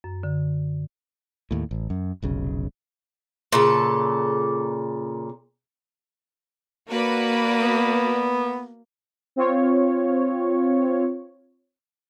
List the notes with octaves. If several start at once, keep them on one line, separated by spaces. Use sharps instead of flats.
F#2
D3
D#2 A2
A1
F#2
F1 B1 C#3
A#2 C#3 A4
A#3 F#4 B4 D5
B3
C4 F4 C#5